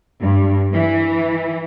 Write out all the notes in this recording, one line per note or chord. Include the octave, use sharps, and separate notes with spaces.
G2
E3